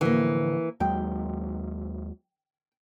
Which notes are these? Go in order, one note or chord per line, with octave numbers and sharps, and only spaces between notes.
A2 D3 E3 F3 A#3
D#2 F#3 G#3 G5